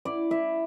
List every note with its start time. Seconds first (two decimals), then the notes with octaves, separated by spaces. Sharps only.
0.05 E4 D5
0.31 E4 E5